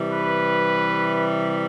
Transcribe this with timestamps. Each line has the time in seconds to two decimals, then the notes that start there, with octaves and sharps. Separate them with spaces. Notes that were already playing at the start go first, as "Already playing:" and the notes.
Already playing: C3 E3 G3
0.11 B4